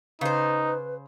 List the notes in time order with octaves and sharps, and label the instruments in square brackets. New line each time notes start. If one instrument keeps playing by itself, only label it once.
[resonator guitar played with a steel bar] C#3 C5 [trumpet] D#4 [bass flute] B4